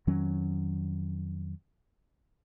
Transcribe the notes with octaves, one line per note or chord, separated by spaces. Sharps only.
F2 D#3 F#3 C#4